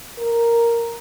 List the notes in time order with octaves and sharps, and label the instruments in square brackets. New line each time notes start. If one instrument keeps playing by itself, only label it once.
[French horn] A#4